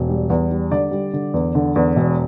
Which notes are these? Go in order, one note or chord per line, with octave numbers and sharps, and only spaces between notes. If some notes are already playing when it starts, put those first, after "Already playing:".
Already playing: E1
G3
E2
G3
D3 D5
G3
D3
E2
D3
E2
E1